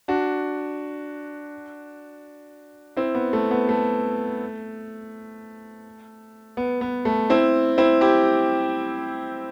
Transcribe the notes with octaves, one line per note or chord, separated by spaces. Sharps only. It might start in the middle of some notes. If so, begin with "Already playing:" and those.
D4 F#4
C4 E4
B3
A3
B3
A3
B3
B3
A3
C4 E4
C4 E4
E4 G4